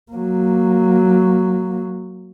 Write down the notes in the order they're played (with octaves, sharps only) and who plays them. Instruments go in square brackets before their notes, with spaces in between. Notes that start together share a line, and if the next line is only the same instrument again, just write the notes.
[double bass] F#3 A#3